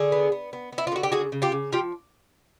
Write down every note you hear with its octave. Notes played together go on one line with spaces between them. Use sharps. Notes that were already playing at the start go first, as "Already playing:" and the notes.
Already playing: D3 G#4
B3
B3
B3
B3
E4
F4
D3 F#4
G4
C#3 F#4 G#4
C#3
F4 G4
C#3
F3 F4 G4